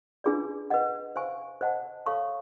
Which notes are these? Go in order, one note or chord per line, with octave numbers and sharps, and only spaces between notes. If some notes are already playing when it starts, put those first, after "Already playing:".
D4 F4 G#4 B4 D5
B4 D#5 F#5
C5 F5 G#5 C#6
C5 D#5 F#5 A5
A4 C#5 F5 A5 C#6